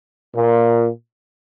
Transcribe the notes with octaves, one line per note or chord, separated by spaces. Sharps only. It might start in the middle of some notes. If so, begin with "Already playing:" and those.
A#2